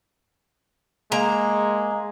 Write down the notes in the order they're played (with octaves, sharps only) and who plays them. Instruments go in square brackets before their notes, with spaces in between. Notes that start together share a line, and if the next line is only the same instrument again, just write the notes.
[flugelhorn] G#3 [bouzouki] A#3 A#5